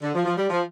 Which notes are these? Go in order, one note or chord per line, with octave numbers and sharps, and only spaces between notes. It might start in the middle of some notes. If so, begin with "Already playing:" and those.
D3
F3
F3
G3
F3